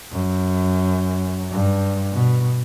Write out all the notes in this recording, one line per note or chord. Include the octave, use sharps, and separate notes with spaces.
F#2
G2
B2